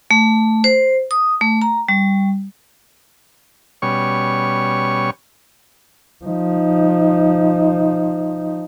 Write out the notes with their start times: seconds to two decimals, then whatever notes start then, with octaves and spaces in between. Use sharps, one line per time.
0.11 A3
0.64 C5
1.11 D#6
1.41 A3
1.62 A#5
1.89 G3
3.82 B2 G3 C#4 C#5 C#6
6.25 F3 D#4